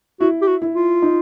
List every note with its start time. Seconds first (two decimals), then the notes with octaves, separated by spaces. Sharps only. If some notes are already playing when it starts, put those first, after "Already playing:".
0.20 E4 F#4
0.42 G4
0.47 F#4
0.62 E4
0.75 F4
1.02 D#4